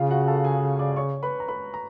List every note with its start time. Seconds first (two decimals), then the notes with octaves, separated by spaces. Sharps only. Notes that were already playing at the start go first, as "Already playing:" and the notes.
Already playing: C#3 F4 F5
0.10 F#4 F#5
0.27 A4 A5
0.44 G#4 G#5
0.79 D5 D6
0.96 C#5 C#6
1.23 B4 B5
1.40 A#5
1.48 B4 B5
1.74 A#5